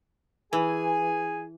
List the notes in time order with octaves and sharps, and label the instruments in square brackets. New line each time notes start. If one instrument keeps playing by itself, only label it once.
[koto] E3 [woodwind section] G#4 G#5